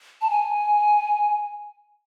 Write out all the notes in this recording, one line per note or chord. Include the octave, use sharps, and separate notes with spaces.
A5
G#5